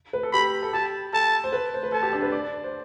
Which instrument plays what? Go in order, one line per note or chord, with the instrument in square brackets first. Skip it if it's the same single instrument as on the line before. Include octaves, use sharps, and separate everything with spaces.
[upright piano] B4
A4
[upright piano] G4 [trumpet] B5
[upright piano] A4
[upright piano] G4 [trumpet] A5
[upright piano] A4 [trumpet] A5
[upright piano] C5
B4
C5
B4
[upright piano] A4 [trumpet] A5
[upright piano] G4
D4
B4
D5
C5